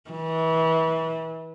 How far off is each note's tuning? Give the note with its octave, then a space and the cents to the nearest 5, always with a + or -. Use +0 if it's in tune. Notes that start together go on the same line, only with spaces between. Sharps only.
E3 -30